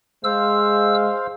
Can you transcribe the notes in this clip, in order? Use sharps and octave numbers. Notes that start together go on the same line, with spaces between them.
G#3 C5 F5 E6